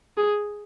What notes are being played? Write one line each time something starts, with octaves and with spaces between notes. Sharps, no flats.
G#4